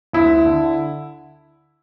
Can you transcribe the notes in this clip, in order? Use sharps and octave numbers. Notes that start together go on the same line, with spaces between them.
D2 E4
D3